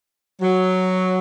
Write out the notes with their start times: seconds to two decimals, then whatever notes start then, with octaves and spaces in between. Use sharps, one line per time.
0.41 F#3